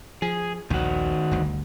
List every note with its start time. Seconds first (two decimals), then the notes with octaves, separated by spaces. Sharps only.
0.22 F3 G#4
0.70 A#1 D#2 D#3 F#4
1.31 G1 D2